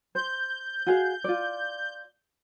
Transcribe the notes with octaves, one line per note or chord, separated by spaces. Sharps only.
C5 G6
F#4 G#4 F5
F4 D5